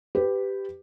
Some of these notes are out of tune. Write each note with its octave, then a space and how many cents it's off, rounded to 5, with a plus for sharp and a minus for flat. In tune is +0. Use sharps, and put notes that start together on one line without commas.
G4 +0 B4 +20